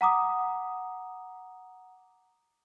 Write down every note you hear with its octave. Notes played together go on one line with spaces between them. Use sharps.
F#5 A#5 D6 D#6